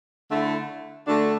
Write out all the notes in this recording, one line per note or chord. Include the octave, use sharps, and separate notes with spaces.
D3 A3 E4
D3 A3 D4 F#4